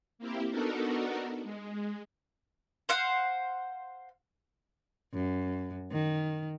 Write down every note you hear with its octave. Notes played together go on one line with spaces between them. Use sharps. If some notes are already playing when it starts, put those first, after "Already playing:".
A#3 C4 E4 G4
B3 D4 D#4 F#4 A4 A#4
G#3
C5 F5 F#5
F#2
D#3